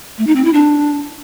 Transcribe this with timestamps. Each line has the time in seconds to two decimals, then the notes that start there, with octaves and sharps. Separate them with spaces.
0.18 A3
0.27 D#4
0.36 C4
0.44 E4
0.53 D4